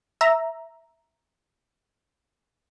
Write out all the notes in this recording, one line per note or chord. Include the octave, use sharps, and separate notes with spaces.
E5 A#5